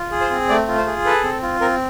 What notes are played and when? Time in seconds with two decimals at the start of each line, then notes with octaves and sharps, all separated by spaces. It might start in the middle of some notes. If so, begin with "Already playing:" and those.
Already playing: F4
0.11 G#4
0.21 C5
0.31 C4
0.49 A3 D5
0.68 F4
0.78 C5
0.86 G#4
1.05 A4 B4
1.24 C4
1.42 F4
1.61 C4 A#4